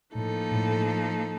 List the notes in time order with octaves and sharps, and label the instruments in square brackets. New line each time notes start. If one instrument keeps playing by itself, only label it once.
[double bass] A2 [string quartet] F3 A#3 D#4 A4
[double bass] A2